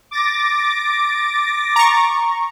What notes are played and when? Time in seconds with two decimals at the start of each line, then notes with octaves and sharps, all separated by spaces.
0.11 D6 A6 A#6
1.76 A#5 C#6